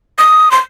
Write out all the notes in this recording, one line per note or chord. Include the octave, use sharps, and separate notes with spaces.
D#6
C6